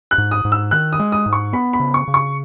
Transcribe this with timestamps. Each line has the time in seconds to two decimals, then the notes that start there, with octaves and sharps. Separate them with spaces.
0.11 F#6
0.18 G#2
0.31 D#6
0.45 G#2
0.52 E6
0.71 D#3 F#6
0.93 D#6
0.99 G#3
1.12 D#6
1.26 G#2
1.33 C#6
1.53 B3 B5
1.73 B5
1.80 C#3
1.94 C#6
2.08 C#3
2.14 C#6